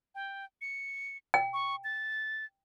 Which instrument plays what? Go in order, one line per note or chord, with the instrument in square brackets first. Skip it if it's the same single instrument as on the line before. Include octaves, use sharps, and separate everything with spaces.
[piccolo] G5
C#7
[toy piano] G5
[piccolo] C#6
A6